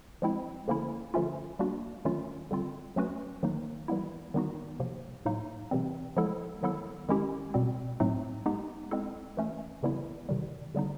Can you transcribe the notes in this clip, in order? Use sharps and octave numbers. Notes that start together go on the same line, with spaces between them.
F3 G#3 C4 E4
D3 F3 A#3 C#4 E4
D3 F3 A3 C#4 F4
G3 A#3 D4 F#4
D#3 F#3 A3 C#4 F4
D3 G3 C4 F4
F#3 A3 C#4 F#4 B4
D#3 F#3 A#3 D#4
E3 G3 B3 E4
D#3 G3 B3 D#4 F#4
C3 F3 A#3
A2 F#3 A#3 D#4
C3 E3 G3 C4
F3 G#3 B3 E4 A4
D#3 F#3 B3 E4 A4
D#3 G#3 C#4 E4 G4
B2 G3 C4
A2 F#3 A3 C4 D#4
G#3 B3 D#4 G4
G#3 C4 E4 A4
E3 A3 C#4
C#3 E3 G3 B3 E4
C3 D#3 G3
D3 G3 B3 D#4